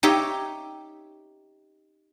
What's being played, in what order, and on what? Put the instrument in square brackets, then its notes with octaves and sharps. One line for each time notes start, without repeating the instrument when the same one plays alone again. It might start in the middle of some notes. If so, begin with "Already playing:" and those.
[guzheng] D#4 G4 C#5 E5